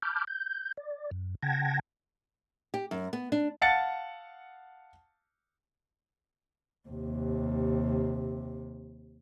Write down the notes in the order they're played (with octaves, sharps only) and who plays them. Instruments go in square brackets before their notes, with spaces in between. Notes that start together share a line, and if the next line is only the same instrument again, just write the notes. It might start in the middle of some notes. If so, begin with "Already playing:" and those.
[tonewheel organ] A5 B5 D6 F6 G6
G6
D5
F#2
C#3 F#5 G5 A5 G#6 A#6
[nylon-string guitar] G4
F#2
B3
D4
[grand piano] F5 F#5 A5 A6 C#7
[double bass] D#2 C3